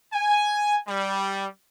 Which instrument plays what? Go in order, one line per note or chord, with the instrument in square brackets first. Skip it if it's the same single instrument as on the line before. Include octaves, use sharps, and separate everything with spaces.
[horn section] G#5
G3